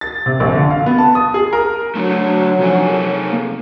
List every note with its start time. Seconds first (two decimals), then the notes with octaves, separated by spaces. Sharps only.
0.01 A6
0.26 C3
0.40 A#1
0.55 D3
0.71 F5
0.86 B3
0.98 A5
1.15 D#6
1.34 G#4
1.53 A#4
1.95 F#3 A3 D4 F#4
2.59 C3 F3 C4 D4 A4 G#5
2.88 G#4 A#4
3.32 A#3